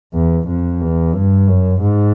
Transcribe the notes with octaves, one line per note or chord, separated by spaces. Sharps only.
E2
F2
E2
G2
F#2
G#2